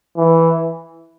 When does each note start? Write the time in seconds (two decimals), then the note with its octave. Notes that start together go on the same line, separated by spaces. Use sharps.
0.17 E3